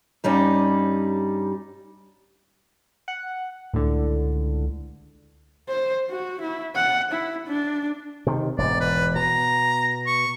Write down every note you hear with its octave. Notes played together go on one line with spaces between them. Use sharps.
G2 G3 C#4 D#4
F#5
C#2 A2 D3
C5
F#4
E4
F#5
E4
D4
C3 D#3
E1 G#2 D5
B4
B2 A#5
C#6